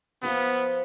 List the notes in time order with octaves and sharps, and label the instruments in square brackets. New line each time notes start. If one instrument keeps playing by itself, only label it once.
[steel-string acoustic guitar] F3 F4 C5 [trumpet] B3